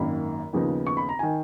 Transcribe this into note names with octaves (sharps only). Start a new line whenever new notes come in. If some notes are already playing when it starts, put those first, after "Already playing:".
Already playing: G#1 F#2 D#3 A#3 B5
D#2 C#3 F3 B3 D#4
C#6
B5
A#5
D#3 G#5